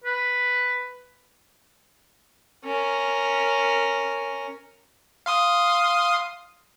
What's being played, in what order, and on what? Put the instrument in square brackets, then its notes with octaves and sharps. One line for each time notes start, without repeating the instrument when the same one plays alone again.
[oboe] B4
[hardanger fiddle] C#4 A#4
[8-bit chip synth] F5 C6 D#6